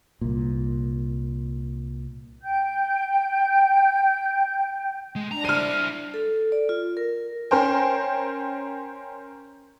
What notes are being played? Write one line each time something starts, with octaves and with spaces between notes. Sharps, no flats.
C2 A#2
G5 G6
G#3
D4 A#5
E4 C5 F6 D#7
A4
D5
F4
A#4
C#4 A#4 C5 G5